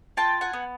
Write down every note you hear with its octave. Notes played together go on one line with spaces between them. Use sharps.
F4 G5 A5
F#5 G#5
B3